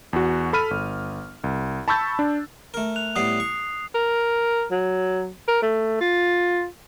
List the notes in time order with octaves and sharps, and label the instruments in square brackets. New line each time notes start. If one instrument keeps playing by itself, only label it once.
[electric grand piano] E2 F#4
A4 B5 F6 D#7
G1
C2
A5 B5 C#6 E6 G6 A6
D4
[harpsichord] A3 A#4
[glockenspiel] F#6 F7
[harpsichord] A2 G3 B3 [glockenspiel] D#6 C7
[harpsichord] C#6
[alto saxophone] A#4
F#3
A#4
A3
F4